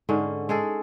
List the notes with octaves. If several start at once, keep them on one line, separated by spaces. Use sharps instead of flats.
G#2 D3 C#4
G#3 G#4 A4